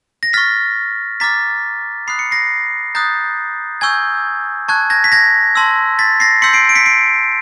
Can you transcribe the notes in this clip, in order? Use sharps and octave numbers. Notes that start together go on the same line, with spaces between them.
A#6
C#6 F6 A6 B6
A#5 D6 F6 A6 B6
B5 D#6 F#6 C7
C#7
A#6 C7
A#5 D#6 F#6 G6 A6
G#5 C#6 E6 G6 G#6
A5 C#6 F#6 G#6
G#6 A#6
B6
G#6 A#6
A5 C6 E6
A6 B6
A#6 C7
C6 E6 G6 B6 C#7
C7 D7
D7
B6 C#7
C7 D7